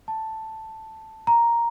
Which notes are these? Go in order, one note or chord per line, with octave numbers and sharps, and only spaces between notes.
A5
A#5